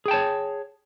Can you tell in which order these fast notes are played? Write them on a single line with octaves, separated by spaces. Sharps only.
G#4 G5 A5 C#5